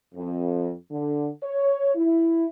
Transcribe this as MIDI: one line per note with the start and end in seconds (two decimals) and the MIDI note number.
0.15 0.71 41
0.91 1.29 50
1.43 1.92 73
1.95 2.45 64